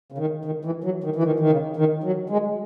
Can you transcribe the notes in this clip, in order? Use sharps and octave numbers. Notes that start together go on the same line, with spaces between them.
C#3
D#3
D#3
E3
F#3
D#3
E3
D#3
D#3
C#3
D#3
F#3
G#3